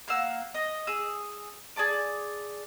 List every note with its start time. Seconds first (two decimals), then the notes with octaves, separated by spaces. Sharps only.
0.08 A#3 F5 F#5 E6
0.54 D#5
0.87 G#4 E6
1.76 G#4 D5 A5 D6